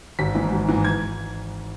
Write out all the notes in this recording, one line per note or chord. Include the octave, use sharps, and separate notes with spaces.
G#1 B6
G#2 E3
G#1
G#2 E3
G#6